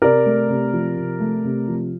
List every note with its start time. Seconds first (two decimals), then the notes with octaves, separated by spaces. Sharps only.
0.02 C3 A#4 D5
0.26 A3
0.49 C3
0.73 F3
0.96 C3
1.20 A3
1.44 C3
1.68 F3